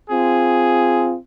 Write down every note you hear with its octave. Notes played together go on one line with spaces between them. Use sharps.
C4 F4 G#4